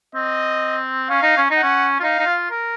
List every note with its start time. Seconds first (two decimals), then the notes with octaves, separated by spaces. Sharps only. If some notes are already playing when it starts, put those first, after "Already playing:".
0.15 C4 D#5
1.09 C#4 F5
1.22 D#4
1.37 C#4
1.50 D#4
1.56 F#5
1.63 C#4
2.00 F4
2.03 D#4 F5
2.19 D#4
2.26 F4
2.50 A#4